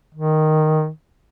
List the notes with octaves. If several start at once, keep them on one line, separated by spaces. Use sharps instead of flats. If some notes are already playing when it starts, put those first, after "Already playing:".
D#3